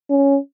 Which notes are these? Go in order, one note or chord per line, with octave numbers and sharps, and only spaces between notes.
C#4